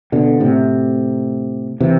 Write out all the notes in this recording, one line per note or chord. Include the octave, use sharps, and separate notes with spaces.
B2 D3
A2 C3
C3 E3